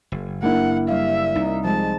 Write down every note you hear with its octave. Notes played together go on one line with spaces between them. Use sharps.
F#1
A#3 D4 E4 F#5
G3 E5 F5
C2 D#4
F3 G#3 A5